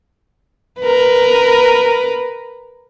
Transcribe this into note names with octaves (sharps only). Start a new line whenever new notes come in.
A#4 B4